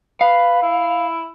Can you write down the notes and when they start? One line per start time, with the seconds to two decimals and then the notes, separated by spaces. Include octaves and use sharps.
0.21 B4 F5
0.63 E4